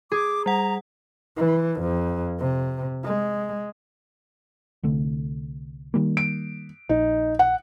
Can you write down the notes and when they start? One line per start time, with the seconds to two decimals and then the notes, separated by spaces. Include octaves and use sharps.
0.12 G#4 D6
0.46 G3 F#5 A#5
1.37 E3
1.81 F2
2.39 C3
3.04 G#3
4.83 C2 D3 A3
5.94 D#3 G3 A#3
6.17 D7
6.89 A#1 D#4
7.39 F#5